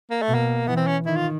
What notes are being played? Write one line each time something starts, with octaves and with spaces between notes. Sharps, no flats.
A#3
A3
B2
A#3
E3 B3
C4
C#4
D#3 E4
F4